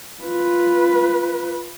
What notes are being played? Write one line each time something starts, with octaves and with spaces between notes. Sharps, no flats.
F4 B4